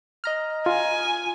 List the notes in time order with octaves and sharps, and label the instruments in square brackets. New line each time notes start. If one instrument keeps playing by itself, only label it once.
[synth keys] D#5 A#5 F6
[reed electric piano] F4 [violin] G#5